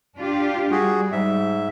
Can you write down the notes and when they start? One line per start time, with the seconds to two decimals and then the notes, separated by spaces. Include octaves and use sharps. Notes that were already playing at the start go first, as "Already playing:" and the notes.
0.18 D4 F4 G4
0.72 G3 F#4 G#4
1.12 G#2 E5